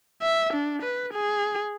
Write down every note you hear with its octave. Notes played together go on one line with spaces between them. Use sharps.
E5
D4
B4
G#4